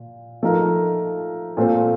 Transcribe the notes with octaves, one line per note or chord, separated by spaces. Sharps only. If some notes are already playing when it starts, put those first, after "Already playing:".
Already playing: A#2
F3 A3 D#4 A#4
A#2 A3 C4 F4 C5